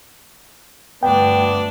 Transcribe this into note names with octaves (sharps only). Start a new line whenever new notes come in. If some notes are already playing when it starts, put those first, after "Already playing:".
D2 G2 B3 D4 G5